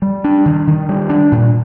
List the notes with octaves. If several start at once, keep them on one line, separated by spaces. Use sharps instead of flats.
G3
D4
D#3
D#3
G3
D4
A#2